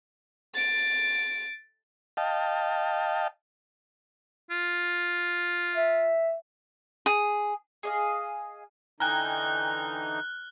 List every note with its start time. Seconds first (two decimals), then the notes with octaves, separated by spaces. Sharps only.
0.55 A6 D7
2.17 D#5 F5 G5 A5
4.51 F4
5.76 E5
7.06 G#4
7.83 G#4 D#5 F5
9.00 D3 E3 D#4 G5 G#5 A#5 F6 F#6